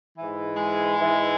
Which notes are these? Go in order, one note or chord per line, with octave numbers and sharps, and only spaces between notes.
G#2 E3
G#3
G#2 E3